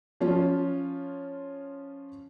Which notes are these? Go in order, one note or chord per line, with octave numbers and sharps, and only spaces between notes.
F3 C#4 F4